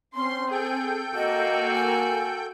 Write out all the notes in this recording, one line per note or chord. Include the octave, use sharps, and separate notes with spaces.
C4 C#4 C6
G#4 A4 G5 G6
A#3 F#4 D#5
G#5